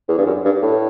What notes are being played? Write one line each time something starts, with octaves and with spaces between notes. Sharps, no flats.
E2
G2
F#2
G2
A2